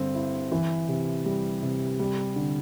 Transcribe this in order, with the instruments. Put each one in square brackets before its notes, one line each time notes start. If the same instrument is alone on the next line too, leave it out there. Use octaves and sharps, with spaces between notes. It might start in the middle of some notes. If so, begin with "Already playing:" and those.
Already playing: [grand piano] G2 D3 C4
E4
E3
C3
G3
C3
G3
D3